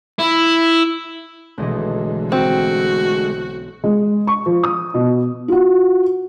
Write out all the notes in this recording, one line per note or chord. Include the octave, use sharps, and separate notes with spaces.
E4
B1 D3 E3 G#3 A3 D#5
C4 F#4
G#3
C#6
F3
D#6
B2
F4 F#4